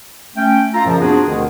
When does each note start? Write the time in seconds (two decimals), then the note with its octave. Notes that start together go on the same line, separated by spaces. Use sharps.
0.36 A3 C#4 G5
0.73 F4 A4 A#5
0.85 F#2 A#2 C#3 F3
1.00 B3 C4 D4 F4 F#4 G#4
1.27 D2 B2 D3 D#3